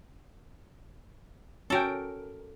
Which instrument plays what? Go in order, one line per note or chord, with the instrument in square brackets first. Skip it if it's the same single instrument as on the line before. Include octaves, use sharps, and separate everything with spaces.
[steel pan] C#4 F#4 G5 [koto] A4 A#4